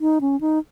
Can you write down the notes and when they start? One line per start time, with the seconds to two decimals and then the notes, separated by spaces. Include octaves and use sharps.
0.01 D#4
0.21 C#4
0.41 D#4